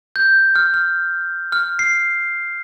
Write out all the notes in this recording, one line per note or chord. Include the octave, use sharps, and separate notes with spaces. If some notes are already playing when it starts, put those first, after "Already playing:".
G6
F6
F6
F6
C7